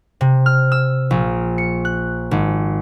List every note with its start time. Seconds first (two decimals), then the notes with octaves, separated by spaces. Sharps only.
0.21 C3
0.46 F6
0.72 E6
1.11 A#1
1.58 C#7
1.85 F#6
2.31 G#1